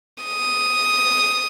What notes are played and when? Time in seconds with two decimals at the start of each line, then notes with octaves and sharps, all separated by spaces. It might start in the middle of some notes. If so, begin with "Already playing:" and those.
0.24 D#6